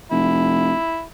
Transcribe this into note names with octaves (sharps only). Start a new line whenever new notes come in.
F1 E4